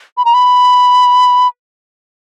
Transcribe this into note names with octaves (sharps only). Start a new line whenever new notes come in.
B5
A#5
B5